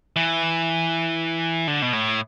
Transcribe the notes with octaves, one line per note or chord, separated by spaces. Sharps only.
E3
D3
B2
A2